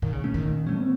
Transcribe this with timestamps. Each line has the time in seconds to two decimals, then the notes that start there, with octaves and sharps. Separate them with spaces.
0.02 A#2 D#3
0.13 C#3
0.24 A3 C#4
0.34 D#3
0.45 A#2
0.67 A3 C#4
0.78 C4